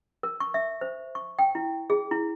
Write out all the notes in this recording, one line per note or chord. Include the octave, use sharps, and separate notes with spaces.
A#4
C#6
E5
C5
C#6
G5
E4
G#4
E4